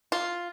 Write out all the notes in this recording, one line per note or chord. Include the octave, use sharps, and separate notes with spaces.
F4